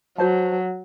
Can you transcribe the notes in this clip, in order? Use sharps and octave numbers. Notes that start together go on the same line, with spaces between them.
F#3 F#4 C5 A5